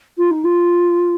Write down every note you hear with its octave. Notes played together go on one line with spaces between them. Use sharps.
F4
D#4
F4